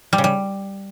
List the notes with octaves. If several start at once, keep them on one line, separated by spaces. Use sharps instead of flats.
G3
C#3
G3